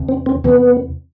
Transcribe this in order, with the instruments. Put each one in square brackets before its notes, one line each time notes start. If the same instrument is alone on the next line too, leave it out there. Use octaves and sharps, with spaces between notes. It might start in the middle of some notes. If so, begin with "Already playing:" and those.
Already playing: [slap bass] E2 C3 E3
[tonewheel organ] C4
C4
[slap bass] E2 C3 E3 [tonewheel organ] B3